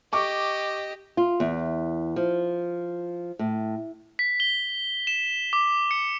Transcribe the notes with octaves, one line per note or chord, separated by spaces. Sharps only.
G4 D#5 C#6 D6
F4
E2
F3
A2
B6
G7
E7
D6
C#7